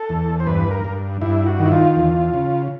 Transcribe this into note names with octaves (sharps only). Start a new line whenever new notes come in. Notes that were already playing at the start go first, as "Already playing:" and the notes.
Already playing: A4
E2
C5
G2 B4
A#4
G2
G2 E4
F#4
D#3
E4
F4
E2
C#3